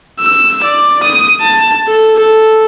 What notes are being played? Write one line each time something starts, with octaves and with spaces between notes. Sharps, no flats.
E6
D5
D#6
A5
A4
A4